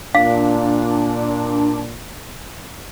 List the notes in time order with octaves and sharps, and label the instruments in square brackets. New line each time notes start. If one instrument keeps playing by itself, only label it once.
[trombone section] A#2 [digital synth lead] D4 [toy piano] F5